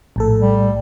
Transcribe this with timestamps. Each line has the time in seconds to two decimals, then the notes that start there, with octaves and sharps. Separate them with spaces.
0.16 A#1 A2 A4
0.40 G3